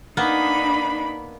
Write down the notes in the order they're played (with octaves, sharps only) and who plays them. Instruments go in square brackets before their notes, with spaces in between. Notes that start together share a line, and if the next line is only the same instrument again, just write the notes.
[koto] A#3 B3 [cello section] D4 D#4 [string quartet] B5